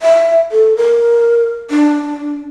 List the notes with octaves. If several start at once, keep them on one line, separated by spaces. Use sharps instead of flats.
E5
A4
A#4
D4